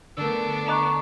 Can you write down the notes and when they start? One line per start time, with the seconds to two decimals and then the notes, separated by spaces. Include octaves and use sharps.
0.17 D3 A3 B3 D4 A#4 E6
0.68 D#5 A#5 C#6 D6 F#6